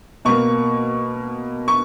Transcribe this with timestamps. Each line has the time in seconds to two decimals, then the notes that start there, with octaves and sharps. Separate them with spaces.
0.25 B2 A#3 C#6
1.68 C#6